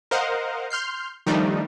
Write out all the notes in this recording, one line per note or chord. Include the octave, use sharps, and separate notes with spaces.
A#4 C5 D#5 F5 F#5
C6 F6 G6 C7
D#3 F3 G3 A3 D4 D#4